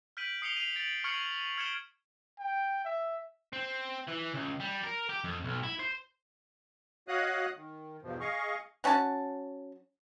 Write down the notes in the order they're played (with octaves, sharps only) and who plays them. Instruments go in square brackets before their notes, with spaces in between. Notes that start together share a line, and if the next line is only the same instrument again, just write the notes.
[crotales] F6 G6 B6 D7 D#7 F#7
D#6 C7 C#7 F7 G7
C7 D#7 F7
A6 D7 F#7
C#6 F6 G#6 C7 C#7 F#7
F6 G#6 C#7 D7 E7 G7
[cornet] G5
E5
[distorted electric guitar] C4
E3
C#2
G3
A#4
G4
F2
B1
E4
C5
[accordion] F#4 C#5 D#5 F5 D#6 F#6
D#3
E2 G2 B2 F3
G#4 D#5 F5 C#6
[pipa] F#3 C#4 F#4 A5